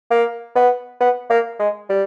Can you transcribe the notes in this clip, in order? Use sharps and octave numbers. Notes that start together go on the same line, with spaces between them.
A#3
B3
B3
A#3
G#3
G3